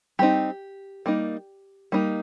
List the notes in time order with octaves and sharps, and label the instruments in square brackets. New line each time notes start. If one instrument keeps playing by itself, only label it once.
[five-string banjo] G3 C4 D#4 G4
G3 A#3 D#4
G3 A#3 D#4